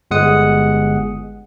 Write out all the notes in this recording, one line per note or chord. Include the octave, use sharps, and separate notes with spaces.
G1 G#3 F#5 D#6 C#7